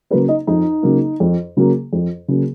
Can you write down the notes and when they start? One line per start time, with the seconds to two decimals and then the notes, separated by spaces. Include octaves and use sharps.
0.10 C#3 F#3 A#3 B4
0.28 D#4 D#5
0.47 F2 D#4 D#5
0.83 C#3 F#3 A#3
1.20 F2
1.57 C#3 F#3 A#3
1.93 F2
2.28 C#3 F#3 A#3